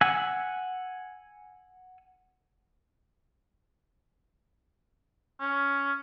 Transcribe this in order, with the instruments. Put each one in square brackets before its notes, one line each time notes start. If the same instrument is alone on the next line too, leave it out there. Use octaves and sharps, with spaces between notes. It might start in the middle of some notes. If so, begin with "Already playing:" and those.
[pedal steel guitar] F#5 G#5 E6
[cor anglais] C#4